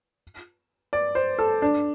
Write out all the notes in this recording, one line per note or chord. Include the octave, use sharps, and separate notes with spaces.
D5
C5
A4
D4